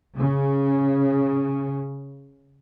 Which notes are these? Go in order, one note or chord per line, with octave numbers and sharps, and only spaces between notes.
C#3